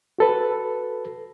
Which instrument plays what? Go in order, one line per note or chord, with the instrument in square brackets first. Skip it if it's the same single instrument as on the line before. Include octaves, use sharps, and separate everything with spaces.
[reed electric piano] F#4 A4 B4